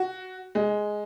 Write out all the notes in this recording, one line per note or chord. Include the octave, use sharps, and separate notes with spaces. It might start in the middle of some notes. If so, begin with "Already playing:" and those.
Already playing: F#4
G#3